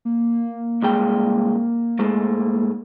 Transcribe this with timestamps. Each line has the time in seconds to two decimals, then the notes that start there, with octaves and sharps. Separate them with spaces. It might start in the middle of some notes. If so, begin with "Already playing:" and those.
0.05 A#3
0.82 C2 G#3 G5
1.99 G#2 G#3 A3